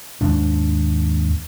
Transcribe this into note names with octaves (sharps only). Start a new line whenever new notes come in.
D#2 G#2 D4